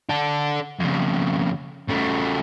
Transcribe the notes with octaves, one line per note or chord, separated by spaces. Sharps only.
D4 A4
F2 C#3
C#3 A3